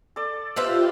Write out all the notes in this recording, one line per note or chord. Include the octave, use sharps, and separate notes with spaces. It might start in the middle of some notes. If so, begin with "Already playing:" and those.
A4 D5
F4 G4 B4 C5 E5 F5